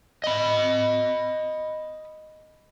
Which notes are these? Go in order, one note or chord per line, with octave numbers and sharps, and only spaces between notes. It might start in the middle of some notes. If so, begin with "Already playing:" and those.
D#5 B5